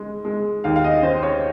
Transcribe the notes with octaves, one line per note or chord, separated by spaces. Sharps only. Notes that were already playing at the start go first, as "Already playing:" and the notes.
Already playing: C#2 G#3
G#3
D#2 F5
F5
D#5
C#4 C5
C#5